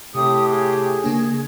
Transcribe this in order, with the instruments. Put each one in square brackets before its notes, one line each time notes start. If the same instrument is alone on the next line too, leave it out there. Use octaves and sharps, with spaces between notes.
[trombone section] A2 G4 [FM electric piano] C3 [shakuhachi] D#6
[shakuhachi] G#4
[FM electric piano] C#3 A#3 D4